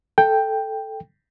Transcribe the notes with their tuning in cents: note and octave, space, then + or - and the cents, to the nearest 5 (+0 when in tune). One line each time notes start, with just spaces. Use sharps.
A4 +0 G5 +5